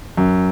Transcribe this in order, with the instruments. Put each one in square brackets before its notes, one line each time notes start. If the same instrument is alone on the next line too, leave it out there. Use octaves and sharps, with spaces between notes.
[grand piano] F#2